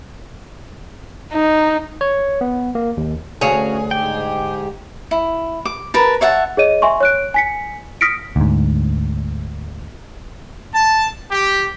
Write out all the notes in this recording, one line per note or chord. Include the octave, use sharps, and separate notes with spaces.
D#4
C#5
B3
A#3
D#2
D2 C#4 F#4 G#4 C#5 F5
G#2 G4 G5
E4
D6
A#4 B4 A5
C#5 E5 F#5 A5
G#4 C#5 D#5 D#7
E5 G#5 C6 C#6
C#5 F#6 D7
G#5 B6 C#7
D#6 F6 A#6 B6 C#7 D7
D2 G#2
A5
G4